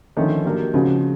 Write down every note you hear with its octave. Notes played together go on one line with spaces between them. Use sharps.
D3 D#3 F3 A3 C#4
F#3 A#3 D4 G4 A#4
C#3 F3 G#3 C4 D#4 F#4